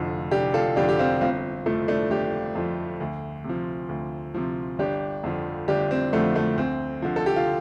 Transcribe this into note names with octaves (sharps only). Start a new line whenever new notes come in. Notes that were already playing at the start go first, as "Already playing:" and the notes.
Already playing: F1 F2 D3 F3
F1 D4 G4
F4 A4
F2 D3 F3 D4 G4
G4
C4 F4
G1 C4 F4
F2 F3 A3
A3 D4
G1 D4 G4
F2 F3
D2
C3
F3
D2
C3 F3
G1 D4 G4
F2 D3 F3
G1 D4 G4
C4
F2 D3 F3 A3
A3
D2 C4
D3 F3
A4
G4
F4